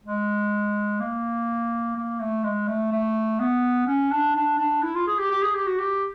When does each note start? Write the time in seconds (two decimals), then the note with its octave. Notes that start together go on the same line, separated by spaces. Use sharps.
0.04 G#3
1.00 A#3
1.96 A#3
2.20 A3
2.44 G#3
2.68 A3
2.92 A3
3.40 B3
3.87 C#4
4.11 D4
4.35 D4
4.59 D4
4.83 E4
4.95 F4
5.07 G#4
5.19 G4
5.31 G4
5.42 G#4
5.55 G4
5.67 F#4
5.79 G4